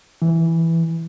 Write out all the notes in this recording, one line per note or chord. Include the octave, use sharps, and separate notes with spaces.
E3